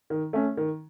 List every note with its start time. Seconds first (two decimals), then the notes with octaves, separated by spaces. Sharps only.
0.10 D#3
0.33 A3 C#4
0.57 D#3